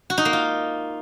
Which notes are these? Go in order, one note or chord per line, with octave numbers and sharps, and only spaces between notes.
F#4
D#4
A#3
F4